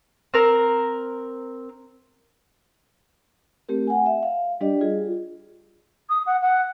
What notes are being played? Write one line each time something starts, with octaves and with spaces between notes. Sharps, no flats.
C4 A#4 A#5
A3 C4 G4 A#4
F#5 G#5
E5
F5
G3 D4 G4 D5 D#5
F4 G#4
D#6
F#5
F#5